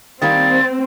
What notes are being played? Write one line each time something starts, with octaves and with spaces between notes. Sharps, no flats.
D#3 G3 A#3 C4 A6